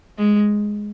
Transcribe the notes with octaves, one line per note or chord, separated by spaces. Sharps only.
G#3